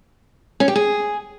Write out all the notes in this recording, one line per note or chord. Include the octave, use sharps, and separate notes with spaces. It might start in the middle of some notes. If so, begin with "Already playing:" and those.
C#4
G4
G#4